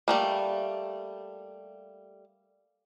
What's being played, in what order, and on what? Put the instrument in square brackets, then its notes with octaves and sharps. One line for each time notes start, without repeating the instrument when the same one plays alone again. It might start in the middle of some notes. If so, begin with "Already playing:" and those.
[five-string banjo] G3 A3 A#3